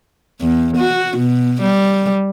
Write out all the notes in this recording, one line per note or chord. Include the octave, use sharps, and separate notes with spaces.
E2
F#4
B2
G3